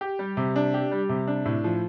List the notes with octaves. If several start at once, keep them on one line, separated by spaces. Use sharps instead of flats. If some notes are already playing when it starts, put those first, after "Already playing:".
G4
G3
C3
D4
G4
G3
C3
D4
A2
F3